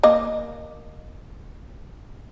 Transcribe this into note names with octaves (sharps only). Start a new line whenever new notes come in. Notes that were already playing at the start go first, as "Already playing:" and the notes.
A#3 D#5